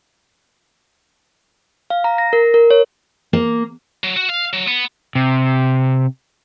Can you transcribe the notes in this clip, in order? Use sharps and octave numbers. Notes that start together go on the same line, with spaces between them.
F5
A#5
A#6
A#4
A#4
C#5
A#3
F#3
F#4
F5
F#3
B3
C3